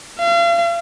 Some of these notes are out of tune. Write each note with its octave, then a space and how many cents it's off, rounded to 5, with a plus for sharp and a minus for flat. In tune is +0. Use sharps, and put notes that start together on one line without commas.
F5 -40